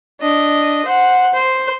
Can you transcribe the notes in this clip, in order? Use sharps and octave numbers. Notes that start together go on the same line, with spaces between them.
D4 D#5
C5 F#5
C5